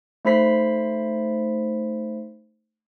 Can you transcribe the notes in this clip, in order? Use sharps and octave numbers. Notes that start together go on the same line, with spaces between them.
A3 D#4 C5 B5 B6 C7